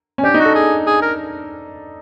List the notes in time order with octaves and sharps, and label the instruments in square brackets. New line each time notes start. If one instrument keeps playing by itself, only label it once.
[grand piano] C#4
[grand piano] D4 [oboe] G4
[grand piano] D#4
[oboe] F#4
[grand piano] A4
[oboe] G#4
G#4
A#4